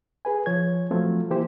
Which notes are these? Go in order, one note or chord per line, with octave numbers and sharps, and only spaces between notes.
G#4 B4 G#5
F3 C#5 G#6
F3 F#3 A3 C4 F4
E3 A#3 E4 G4 C5